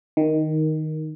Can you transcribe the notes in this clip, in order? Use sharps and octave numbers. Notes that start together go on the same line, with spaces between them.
D#3